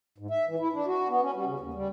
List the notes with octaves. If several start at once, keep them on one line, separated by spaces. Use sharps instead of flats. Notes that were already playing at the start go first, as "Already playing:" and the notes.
G#2
E5
E3
E4
D4
F#4
B3
C#4
G3
C#3
D#2
G3